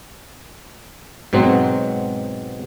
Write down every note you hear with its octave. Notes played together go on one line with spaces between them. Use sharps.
G#2 B2 F#3 C4